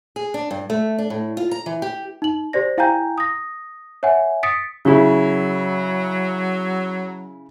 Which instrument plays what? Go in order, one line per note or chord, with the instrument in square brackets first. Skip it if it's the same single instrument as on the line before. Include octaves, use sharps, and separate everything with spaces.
[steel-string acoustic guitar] G#4
D4
G2
A3
D4
A2
F4
A#5
E3
G4
[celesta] D#4 F#7
G4 C5 D5 A#6
E4 F5 G5 G#5 A#5 G6
D#6 A#6
C#5 E5 F#5 G#5
D#6 A6 B6 C#7 D7
[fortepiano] C#3 E4 [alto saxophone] F#3